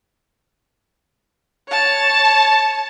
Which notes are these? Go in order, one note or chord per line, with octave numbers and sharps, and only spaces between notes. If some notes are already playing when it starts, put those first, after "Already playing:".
C#5 A5